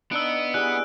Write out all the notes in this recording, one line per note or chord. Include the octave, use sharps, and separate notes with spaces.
B3 D4 D#4 E5 F5 E6 D7
E3 G3 G#3 G4 G#4 F#6